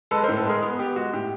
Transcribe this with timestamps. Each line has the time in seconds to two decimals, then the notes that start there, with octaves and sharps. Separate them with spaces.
0.11 G#3 A4 B4
0.24 A#4 C5
0.28 A2
0.36 A4 B4
0.45 G#3 G#4 A#4
0.62 B3
0.79 B3 G4
0.96 G#3 F#4
1.13 A2 G4